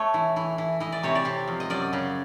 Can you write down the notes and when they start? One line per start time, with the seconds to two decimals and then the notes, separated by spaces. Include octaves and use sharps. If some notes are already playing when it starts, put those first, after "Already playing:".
Already playing: A3 C#5
0.14 E3
0.36 E3
0.58 E3
0.80 E3 D#5
0.92 D5
1.03 C3 C#5
1.15 D5
1.25 C3
1.47 F2
1.60 D#5
1.70 F#2 D5
1.93 C#3